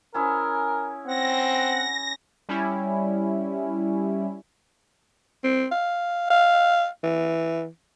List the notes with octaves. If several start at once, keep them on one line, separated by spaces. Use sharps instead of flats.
C#4 E4 G#4 A#4
C4 F#5 A#6
G3 C#4 E4
C4
F5
F5
E3